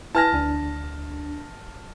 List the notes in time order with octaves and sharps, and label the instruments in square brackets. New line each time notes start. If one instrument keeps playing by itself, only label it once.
[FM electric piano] E4 B4 G#5 [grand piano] A5 F6 A#6
[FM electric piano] D2 D4